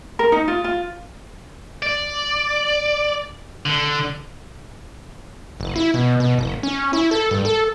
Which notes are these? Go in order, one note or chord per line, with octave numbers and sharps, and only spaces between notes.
A#4
D#4
F4
F4
D5
D3
F#1
E4
B2
B2
F#1
C#4
E4
A4
G2
A4